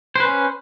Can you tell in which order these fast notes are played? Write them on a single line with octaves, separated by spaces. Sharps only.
C5 B4 C#4